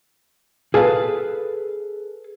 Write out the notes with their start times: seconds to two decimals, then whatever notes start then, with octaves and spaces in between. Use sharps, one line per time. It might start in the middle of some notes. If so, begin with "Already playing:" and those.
0.74 G#4 A4 B4 F5